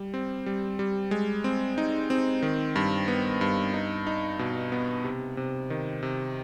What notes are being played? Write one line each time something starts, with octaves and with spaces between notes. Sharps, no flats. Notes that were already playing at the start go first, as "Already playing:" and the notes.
Already playing: G3
C4
G3
G3
G#3
C4
D#4
C4
D#3
G2
B3
G2
D#4
D#4
B2
B3
C3
C3
D#3
C3